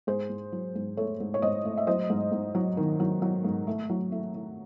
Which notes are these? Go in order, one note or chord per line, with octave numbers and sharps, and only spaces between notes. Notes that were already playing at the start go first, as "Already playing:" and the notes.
G#2 G#4 C5
G#2
F#3
G#2
A3 A4 C#5
G#2
C#5
G#2 C5 D#5
A3
E5
F#3 C5 D#5
G#2
G#2
F#3
D#3
F#3
F#3
G#2
A3
F#3
A3
A3